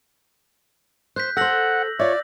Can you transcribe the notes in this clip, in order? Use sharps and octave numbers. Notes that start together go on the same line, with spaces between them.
C5 F#6 G6 B6
A4 C5 F#5 E6 A#6 F#7
F4 C#5 D5 E5